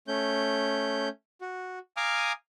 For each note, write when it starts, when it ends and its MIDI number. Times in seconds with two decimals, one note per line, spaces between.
0.08 1.09 57
0.08 1.09 61
0.08 1.09 91
1.41 1.79 66
1.97 2.32 77
1.97 2.32 80
1.97 2.32 82
1.97 2.32 86
1.97 2.32 87
1.97 2.32 89